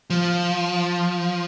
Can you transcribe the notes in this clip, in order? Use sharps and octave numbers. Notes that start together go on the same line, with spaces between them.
F3